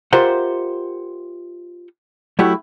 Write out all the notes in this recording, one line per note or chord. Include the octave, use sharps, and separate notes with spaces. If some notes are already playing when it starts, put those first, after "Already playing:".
F4 G4 A#4 C5 E5 F#5
F#3 A3 E4 F#4 G4